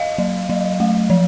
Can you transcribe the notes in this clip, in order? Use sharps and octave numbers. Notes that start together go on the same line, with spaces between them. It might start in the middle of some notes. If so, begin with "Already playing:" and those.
Already playing: D#5 F5
F#3
F#3
A3
F3